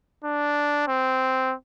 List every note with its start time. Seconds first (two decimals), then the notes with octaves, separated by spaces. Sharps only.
0.24 D4
0.88 C4